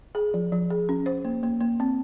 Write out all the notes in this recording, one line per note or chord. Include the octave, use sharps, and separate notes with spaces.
G#4
F3
F3
G#4
C#4
C5
A#3
A#3
A#3
C4